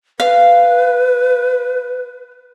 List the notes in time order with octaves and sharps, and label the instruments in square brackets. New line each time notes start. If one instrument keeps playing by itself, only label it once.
[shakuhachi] B4 [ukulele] F5